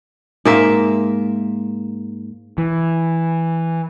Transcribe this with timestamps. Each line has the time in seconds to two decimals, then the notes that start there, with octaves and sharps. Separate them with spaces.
0.45 G#2 A#3 E5
2.58 E3